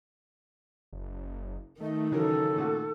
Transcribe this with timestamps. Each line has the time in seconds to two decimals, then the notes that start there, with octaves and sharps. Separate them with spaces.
0.93 F#1
1.80 D#3 A3 D#5
2.12 C#3 E3 F#3 A4 A#4
2.56 A#2 A3 F#4